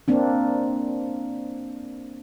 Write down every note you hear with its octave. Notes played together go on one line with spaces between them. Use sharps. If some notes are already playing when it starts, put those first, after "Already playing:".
A#3 C4 D4